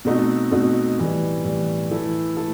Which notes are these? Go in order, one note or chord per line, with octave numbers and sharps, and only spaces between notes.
B2 A3 C4 D#4 F#4
B2 A3 C4 D#4 F#4
A2 E3 G3
A2 E3 G3
E3 A3 E4 A4
A3 E4 A4